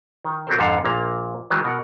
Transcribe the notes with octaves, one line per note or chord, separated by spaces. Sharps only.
D#3
F#3 C4 G4 A4 A#4 C5
F2 G#2 D3 A4 F5
A#1 A#2 A#3 A#5
D#3 E3 F#3 G#3
B2 A#4 F#5